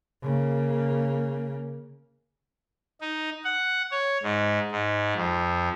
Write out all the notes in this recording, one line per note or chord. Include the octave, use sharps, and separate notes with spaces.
C#3 A#3
D#4
F#5
C#5
G#2
G#2
F2